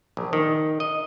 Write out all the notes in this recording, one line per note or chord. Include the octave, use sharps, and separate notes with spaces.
A#1
D#3
D#5